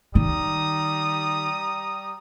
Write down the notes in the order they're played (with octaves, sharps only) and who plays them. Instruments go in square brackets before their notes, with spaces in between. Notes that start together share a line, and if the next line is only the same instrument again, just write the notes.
[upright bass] D#3 [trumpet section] G3 A#5 D#6